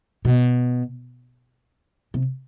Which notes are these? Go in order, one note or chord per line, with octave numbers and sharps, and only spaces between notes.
B2
C3